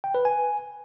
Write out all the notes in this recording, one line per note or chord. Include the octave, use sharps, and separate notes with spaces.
G5
B4
G#5